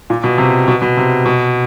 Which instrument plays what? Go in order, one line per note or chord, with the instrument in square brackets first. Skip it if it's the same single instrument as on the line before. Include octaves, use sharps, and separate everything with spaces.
[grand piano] A#2
B2
C3
B2
B2
C3
B2